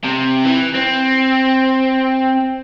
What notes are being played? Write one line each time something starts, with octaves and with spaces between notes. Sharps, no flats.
C3
E3
C4